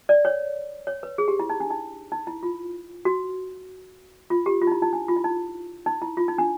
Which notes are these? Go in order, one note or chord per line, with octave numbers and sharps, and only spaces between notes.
D5
C#5
C#5
B4
G#4
G4
E4
D#4
D4
D#4
D#4
E4
F4
F#4
F4
G4
F4
D#4
E4
D#4
D4
F4
E4
D#4
D#4
E4
F4
D#4
D4